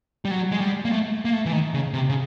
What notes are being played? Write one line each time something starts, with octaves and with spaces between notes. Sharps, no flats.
G3
F#3
G#3
G3
A#3
A3
A#3
A3
E3
D#3
C#3
C3
C#3